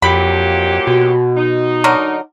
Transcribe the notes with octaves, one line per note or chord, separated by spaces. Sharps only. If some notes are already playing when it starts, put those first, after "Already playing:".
F2 A#2 F#3 G4 B5
B2 F#4
D#4
D3 F#3 A#4